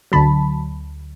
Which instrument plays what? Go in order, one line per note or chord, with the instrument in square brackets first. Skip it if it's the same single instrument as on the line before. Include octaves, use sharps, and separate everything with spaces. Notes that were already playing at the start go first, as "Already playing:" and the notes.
[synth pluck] D2 D3 F#3 A5 B5